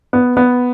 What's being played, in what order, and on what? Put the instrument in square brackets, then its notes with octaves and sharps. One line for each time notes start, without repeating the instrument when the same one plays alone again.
[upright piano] B3
B3